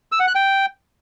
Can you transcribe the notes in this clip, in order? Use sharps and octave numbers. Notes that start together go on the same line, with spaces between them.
E6
F#5
F#6
G5